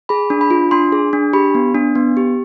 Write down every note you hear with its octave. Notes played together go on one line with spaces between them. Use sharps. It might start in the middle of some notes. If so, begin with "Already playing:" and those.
G#4 B5
D4
B5
F4
D4 C6
G#4
D4
G4 B5
B3
D4
B3
G4